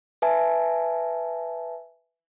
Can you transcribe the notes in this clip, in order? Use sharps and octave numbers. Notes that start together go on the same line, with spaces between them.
B4 E5 G#5 A5